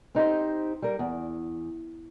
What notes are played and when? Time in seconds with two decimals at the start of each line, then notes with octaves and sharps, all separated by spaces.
0.15 C4 D#4 G4 C5
0.82 G3 A#4
0.99 E2